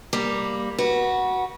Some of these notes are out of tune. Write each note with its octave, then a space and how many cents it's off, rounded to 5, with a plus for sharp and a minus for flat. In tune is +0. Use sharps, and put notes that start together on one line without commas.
G3 +5 A#3 +0
F#4 +0 B4 -30